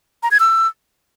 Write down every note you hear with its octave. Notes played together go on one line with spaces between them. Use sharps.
A#5
G#6
E6